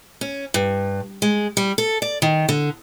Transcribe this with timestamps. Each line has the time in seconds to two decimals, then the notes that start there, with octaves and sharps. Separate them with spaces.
0.21 C#4
0.54 G2
1.22 G#3
1.57 G3
1.78 A4
2.02 D5
2.22 D#3
2.49 D3